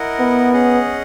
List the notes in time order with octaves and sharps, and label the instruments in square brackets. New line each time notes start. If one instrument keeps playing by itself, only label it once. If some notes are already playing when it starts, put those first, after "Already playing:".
Already playing: [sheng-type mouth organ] E4 A#4 D#5 F#5
[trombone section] B3
[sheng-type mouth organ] C#4 G#4 D#5 F#5